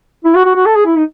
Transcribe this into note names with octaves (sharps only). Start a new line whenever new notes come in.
E4
F#4
F#4
F#4
A4
G#4
E4
D#4